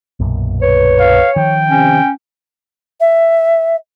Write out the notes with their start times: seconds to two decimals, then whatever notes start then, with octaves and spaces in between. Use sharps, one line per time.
0.20 B1 F#2 A#2
0.62 B4 C#5
1.00 F5
1.36 D#3 F3 G5
1.70 C3 C#4
3.00 E5